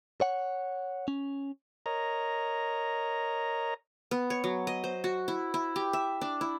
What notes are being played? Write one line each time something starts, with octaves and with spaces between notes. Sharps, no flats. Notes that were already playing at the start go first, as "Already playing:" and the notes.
C#5 F#5
C#4
A#4 C#5 D#5 A#5
B3
C#5
F#3
D#5
C5
F#4
E4
E4
G4
E5
D4
E4